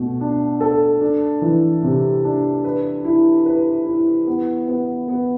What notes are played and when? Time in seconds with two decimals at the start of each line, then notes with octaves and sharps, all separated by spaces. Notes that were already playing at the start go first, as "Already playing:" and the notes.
Already playing: B2 A3
0.21 D4
0.61 A4
1.01 D4
1.42 E3
1.83 C3
2.24 D4
2.64 B4
3.05 E4
3.46 B4
3.86 E4
4.27 B3
4.68 B3
5.08 B3